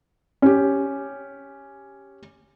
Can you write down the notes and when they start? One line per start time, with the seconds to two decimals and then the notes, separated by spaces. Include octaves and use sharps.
0.42 C#4 G4